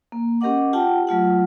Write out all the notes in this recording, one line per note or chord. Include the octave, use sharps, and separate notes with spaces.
A#3
C#4 G4 A#4 D#5 F#5 D6
F4 G4 F#5 G5 A5
F#3 A3 F4 F#5